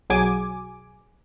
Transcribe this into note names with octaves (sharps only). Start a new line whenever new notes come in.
B1 F#3 G#4 G#5 D6